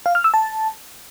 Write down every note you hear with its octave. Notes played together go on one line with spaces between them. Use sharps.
F5
F6
E6
A5